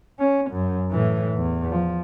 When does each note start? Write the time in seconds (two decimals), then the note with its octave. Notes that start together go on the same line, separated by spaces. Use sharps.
0.19 C#4
0.51 F#2
0.91 A2 E3
1.35 E2
1.71 F3